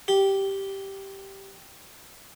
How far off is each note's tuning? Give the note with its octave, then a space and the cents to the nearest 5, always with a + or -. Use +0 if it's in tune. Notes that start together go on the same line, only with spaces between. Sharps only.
G4 -5